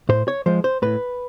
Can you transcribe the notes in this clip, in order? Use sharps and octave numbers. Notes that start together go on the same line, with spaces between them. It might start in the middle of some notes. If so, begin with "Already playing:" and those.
A2 C5
C#5
F3 G#3 C5
C5
A2 B4